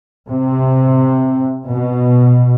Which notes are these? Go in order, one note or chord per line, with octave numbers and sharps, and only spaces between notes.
C3
B2